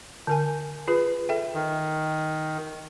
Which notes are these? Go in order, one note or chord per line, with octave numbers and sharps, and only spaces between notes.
D3 A#4 G#5
F4 G#4 B4
A4 E5 G5
D#3